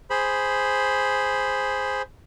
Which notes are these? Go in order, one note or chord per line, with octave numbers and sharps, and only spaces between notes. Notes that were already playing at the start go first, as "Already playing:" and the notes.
G#4 C5 B5